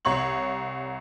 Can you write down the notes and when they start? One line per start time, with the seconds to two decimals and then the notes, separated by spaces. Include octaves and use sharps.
0.05 C2 C#5 A#5 C#6 F#7